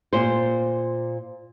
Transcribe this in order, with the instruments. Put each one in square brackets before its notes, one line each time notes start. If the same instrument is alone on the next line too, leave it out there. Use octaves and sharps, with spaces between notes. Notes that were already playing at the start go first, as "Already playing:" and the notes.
[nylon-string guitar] A#2 C5